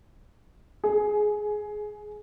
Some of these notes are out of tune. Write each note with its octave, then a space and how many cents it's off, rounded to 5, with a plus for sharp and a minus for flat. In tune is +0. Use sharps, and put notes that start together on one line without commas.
G#4 +15